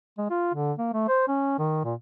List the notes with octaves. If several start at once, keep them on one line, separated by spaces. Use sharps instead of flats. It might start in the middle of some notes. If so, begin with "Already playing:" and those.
G#3
F4
D3
A#3
A3
C5
C#4
D#3
A#2